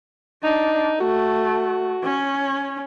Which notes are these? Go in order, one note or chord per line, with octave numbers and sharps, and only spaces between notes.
D4 D#4
A3 F#4
C#4